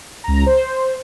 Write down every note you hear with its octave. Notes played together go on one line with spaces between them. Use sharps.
C#2 A#5
C5